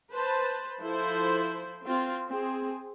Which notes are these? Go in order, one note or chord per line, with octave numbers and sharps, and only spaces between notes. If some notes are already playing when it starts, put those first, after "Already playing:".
B4 C5 A5
F3 E4 A4 C5
C4 F4
C4 G#4